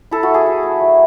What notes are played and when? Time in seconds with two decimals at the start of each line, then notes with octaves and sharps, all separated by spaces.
0.11 E4 A4
0.23 F#4
0.29 A3 G#4
0.46 E4
0.63 A3
0.81 F#3